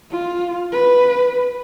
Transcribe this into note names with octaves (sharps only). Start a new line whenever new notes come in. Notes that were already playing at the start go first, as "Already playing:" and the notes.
F4
B4